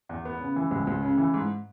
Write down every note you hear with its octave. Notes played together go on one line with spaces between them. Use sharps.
E2
B3
C#3
E3
C#2
C#2
C#3
E3
G#2